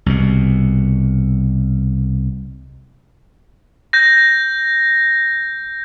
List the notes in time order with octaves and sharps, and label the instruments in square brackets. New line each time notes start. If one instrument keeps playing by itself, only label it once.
[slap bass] C2 B2
[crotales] G6 A#6